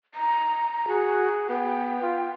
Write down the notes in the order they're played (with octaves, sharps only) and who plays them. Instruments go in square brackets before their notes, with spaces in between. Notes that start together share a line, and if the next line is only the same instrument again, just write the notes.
[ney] A#5
[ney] F#4 [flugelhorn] G#4
[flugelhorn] B3 [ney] G5
[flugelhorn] F4